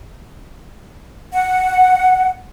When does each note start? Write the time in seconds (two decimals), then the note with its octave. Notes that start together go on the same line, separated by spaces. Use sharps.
1.33 F#5